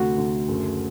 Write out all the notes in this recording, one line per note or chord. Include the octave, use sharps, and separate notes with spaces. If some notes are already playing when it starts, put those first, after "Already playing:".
Already playing: D2 C3 A3 F#4
D2
F#1